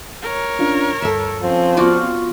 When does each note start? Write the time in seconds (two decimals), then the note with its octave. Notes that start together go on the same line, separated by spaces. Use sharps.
0.23 A#4 C#5
0.59 C#4 D4 F4
1.02 D2 G2 A4 E5
1.43 F3 C4 C#4
1.77 B3 F4 F#4 D5 C6 C#6